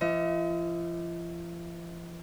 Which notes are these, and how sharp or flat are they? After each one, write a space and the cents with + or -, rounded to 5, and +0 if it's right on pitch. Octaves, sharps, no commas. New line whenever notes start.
F3 -40 D#5 +35